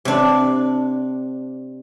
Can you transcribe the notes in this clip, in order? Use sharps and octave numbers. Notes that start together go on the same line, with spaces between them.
C3 D4